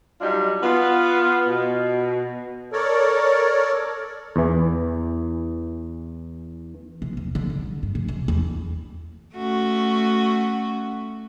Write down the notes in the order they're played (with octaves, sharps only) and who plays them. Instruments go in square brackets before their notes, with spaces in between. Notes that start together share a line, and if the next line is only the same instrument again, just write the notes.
[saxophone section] F#3 G3 D4 D#4 F4
B3 F4
B2
[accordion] A4 A#4 C#5 D5
[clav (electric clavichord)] E2 E3
[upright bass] C3
E2
D3
G3
G2
C3
E1
E2
[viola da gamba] A3 C#4 F#4